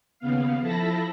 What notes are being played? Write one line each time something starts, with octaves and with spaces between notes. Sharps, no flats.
D#2 C#3 B3 F5
F3 E4 A4 A5 B5 A#6